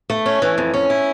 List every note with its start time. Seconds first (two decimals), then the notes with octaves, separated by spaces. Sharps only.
0.10 A3
0.26 C#4
0.42 E3
0.58 F2
0.74 C#4
0.90 E4